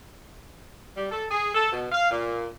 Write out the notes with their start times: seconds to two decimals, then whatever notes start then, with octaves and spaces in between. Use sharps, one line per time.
0.96 G3
1.12 A4
1.31 G#4
1.55 A4
1.72 B2
1.92 F5
2.11 A#2